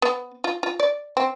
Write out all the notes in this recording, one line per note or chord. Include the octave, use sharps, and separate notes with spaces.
B3
F4
F4
D5
C4